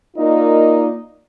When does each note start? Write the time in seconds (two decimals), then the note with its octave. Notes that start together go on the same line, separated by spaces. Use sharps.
0.16 A#3 D#4 F4 A#4 D5 D#5